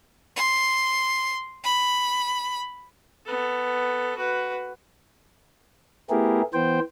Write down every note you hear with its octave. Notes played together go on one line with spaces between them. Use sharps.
C6
B5
B3 A4
F#4 B4
A3 B3 E4 G4 G#4 A#4
E3 B3 C5 G5